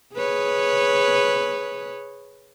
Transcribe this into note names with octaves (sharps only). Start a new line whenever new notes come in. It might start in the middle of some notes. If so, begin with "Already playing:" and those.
G#4 B4 C#5